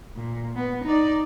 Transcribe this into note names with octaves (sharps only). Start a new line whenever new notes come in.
A#2
B3
D#4 D5